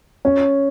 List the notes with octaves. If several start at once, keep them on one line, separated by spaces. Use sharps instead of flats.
C#4